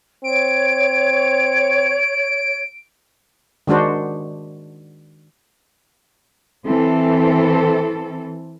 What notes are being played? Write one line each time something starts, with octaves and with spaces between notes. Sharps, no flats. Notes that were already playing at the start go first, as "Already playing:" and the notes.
C4 C#5 D7
D#3 G#3 D4 F#4 C5
E3 C4 A4